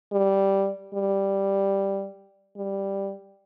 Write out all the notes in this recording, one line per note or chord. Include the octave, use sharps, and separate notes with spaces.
G3
G3
G3